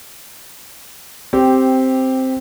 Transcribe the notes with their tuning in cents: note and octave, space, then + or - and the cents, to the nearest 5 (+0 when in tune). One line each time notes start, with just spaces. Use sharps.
C4 +0 G4 -5